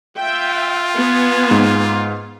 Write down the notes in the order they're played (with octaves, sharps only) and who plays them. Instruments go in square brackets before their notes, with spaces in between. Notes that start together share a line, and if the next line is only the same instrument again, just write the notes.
[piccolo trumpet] F4 [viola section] E5 G5
[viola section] B3 G#5
[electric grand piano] G#2